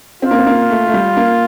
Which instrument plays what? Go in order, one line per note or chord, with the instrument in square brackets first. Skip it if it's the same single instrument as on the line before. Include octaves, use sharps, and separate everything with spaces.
[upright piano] C4 [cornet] F4
[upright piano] A#3
C4
A#3
A3
A3
G3
A#3